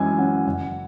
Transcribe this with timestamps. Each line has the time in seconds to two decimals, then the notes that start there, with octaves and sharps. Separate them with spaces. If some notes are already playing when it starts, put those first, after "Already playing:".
Already playing: F#2 E3 G#3 G#5
0.18 C#4 F#5
0.46 F#1 F#5